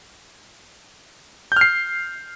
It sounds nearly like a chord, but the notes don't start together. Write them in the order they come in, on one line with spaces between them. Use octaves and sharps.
G6 F6 C7